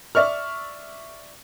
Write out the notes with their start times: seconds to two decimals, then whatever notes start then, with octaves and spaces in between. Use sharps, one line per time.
0.15 D5 E5 C#6 F6